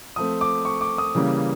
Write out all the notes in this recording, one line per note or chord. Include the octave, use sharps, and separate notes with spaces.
F3 A3 C4 D#6
D6
C#6
D6
D#6
C#3 E3 G3 A#3 C#4